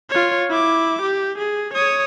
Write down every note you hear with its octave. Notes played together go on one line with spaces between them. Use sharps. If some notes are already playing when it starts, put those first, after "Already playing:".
F4 C#5
E4 D6
G4
G#4
C#5 D#6